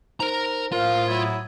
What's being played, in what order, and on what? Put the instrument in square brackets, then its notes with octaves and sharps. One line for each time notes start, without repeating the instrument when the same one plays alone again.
[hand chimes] D#4 C5 [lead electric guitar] A#4 A#5
[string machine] A2 D#6 [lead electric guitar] F4 [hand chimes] A#4 C5 [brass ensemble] F5
[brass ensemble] F#3 E4 [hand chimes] E5 G#6